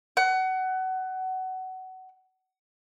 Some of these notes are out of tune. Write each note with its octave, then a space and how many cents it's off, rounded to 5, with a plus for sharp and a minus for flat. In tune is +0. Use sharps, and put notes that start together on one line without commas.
F#5 +20